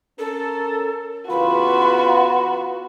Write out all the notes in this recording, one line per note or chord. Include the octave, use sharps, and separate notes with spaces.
C#4 A4 A#4
C#3 E3 B3 F4 F#4 B4 B5